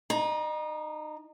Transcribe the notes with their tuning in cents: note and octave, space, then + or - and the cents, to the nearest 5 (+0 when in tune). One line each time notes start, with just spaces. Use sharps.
D#4 -30 A#5 +35